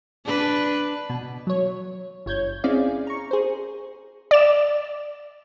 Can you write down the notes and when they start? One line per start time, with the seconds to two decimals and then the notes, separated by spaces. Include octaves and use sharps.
0.25 D4 B4
1.10 B2
1.47 F#3 C#5
2.26 G1 C#5 G6 G#6
2.64 C4 C#4 E4 G#4 D5 F5
3.07 A#5 C#6
3.31 G#4 C5
4.31 D5 E7